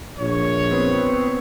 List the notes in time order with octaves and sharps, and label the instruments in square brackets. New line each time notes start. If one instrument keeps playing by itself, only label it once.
[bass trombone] A#1 [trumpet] C#5
[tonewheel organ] B3 C4